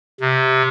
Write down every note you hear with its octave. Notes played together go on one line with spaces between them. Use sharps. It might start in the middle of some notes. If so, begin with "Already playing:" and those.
C3